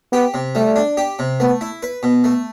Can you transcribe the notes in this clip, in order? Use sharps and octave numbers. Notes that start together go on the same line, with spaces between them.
B3 G4
C3
G3 A3
D4
G4
C3
A3 B3
E4
B4
B2
A3